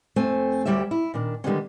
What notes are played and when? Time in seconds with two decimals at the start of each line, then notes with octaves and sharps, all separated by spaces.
0.16 F2 A3 C4 G#5
0.65 D2 C3 G3 G4 C#5 E5
0.91 E4
1.14 A#2 D#3 D4
1.44 D3 D#3 G3 G#3 B3 C#4